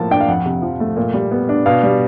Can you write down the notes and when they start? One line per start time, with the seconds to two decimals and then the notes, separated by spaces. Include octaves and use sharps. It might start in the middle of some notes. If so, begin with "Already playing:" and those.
Already playing: A2 F3 A#3 A5
0.11 D4 G5
0.20 F5
0.28 F2 F#5
0.45 C3
0.62 F3
0.80 A3
0.97 A#2
1.13 G3
1.31 B3
1.49 D4
1.66 B2 F5
1.83 G3